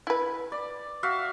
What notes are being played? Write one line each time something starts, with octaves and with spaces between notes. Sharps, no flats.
E4 B4
D5
F#4 E5 F5